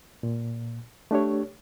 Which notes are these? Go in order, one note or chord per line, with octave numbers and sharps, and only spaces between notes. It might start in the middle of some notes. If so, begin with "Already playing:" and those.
A#2
A3 D4 G4 C#5